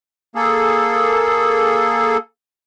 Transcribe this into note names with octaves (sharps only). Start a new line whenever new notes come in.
A#3 G#4 A4